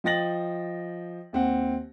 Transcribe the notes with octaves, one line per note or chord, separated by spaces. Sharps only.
F3 D#5 G5 A6 A#6 F#7
D#2 C4 F#5